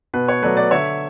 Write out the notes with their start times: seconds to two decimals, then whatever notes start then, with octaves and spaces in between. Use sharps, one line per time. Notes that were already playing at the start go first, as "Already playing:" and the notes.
0.14 B2 B4
0.28 C#5
0.42 F#3 A3 B4 D5
0.57 B4 D5
0.71 D3 C#5 E5